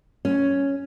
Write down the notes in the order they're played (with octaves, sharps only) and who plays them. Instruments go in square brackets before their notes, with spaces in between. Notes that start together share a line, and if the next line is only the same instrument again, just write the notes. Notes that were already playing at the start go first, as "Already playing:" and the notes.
[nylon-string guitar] C#4